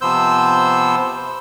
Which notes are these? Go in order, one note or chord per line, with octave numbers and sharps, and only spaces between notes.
C3 F3 B3 C5 E6 G6